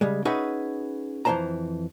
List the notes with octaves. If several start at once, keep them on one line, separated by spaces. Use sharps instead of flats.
C#3 G3 G#3
C#4 D#4 F#4 G#4 B4 E5
F2 E3 C4 C5 A5 A#5